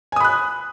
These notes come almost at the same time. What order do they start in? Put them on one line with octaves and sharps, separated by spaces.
G#5 D#6 B5 F#6